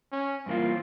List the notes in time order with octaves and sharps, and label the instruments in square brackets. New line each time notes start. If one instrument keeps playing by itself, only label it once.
[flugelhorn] C#4
[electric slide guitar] G2 E3 A#3 F4 [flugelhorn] C4